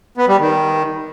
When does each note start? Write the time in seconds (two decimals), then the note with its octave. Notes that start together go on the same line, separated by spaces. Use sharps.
0.17 B3
0.28 G3
0.39 D#3